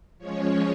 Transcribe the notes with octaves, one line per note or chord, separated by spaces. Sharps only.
F3 G#3 C#4 C#5